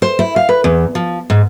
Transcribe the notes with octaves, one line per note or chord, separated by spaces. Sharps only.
C5
E4
F5
B4
E2
F3
G#2